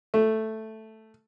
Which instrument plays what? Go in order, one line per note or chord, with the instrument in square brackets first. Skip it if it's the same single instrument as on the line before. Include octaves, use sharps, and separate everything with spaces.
[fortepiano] A3